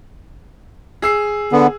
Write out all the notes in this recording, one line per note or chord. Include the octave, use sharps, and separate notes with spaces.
G#4 E6 C7
D3 B3